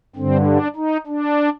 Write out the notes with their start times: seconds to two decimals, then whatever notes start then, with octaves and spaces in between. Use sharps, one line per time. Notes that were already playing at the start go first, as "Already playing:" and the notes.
0.16 G2 D3 C4
0.46 D4
0.76 D#4
1.07 D4